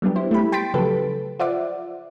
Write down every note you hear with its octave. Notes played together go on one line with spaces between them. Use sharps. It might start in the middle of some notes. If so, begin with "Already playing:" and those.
F#3 G3 B3 D4 G4
E4 C5
A3 E4 G4 B5
G5 C6 A6 B6 D7
C#3 F3 F#3 G4 A4 B4
F4 C5 D5 E5 F#5 D6